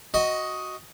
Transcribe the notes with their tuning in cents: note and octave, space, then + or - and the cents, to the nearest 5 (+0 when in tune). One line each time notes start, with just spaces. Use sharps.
F#4 +0 D#5 +10